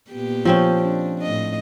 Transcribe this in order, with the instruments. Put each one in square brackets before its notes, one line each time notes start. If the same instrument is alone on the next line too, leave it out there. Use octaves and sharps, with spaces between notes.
[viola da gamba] A#2 B3 G4
[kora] F3 C4 C#4
[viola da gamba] D4
A2 D#5